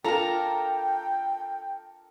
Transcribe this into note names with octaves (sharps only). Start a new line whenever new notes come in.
D4 F4 A4 A#4 G5 A#5